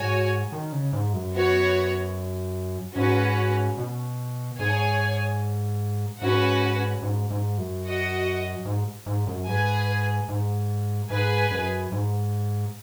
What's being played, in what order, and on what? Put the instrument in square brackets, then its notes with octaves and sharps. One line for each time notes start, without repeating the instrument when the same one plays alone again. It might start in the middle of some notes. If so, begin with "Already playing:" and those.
Already playing: [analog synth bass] G#2 [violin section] F#4 C#5 G#5
[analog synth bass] D#3
C#3
G#2
F#2
[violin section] B3 F#4 C#5
[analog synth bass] G#2 [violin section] C#4 F#4 B4
[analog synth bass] B2
[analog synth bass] G#2 [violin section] G#4 C#5 G#5
[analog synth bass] G#2 [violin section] C#4 F#4 B4 F#5
[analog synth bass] G#2
G#2
F#2
[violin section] F#4 D#5 F#5
[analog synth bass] G#2
G#2
F#2
[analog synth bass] G#2 [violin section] G#4 B4 G#5
[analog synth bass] G#2
[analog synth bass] G#2 [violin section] G#4 B4 G#5
[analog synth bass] F#2
G#2